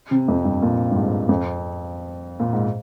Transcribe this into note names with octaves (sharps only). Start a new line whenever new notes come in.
C3
F2
G2
A#2
G2
G#2
F2
A#2
G#2